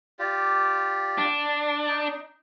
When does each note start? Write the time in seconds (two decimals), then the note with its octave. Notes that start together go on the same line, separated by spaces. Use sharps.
0.19 F4 G4 D5
1.18 D4
1.88 D#4